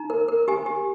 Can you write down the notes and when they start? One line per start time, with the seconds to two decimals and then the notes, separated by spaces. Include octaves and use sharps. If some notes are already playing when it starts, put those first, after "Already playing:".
Already playing: D#4 A#5
0.10 A#4
0.28 A#4
0.48 G4 G#5
0.66 G4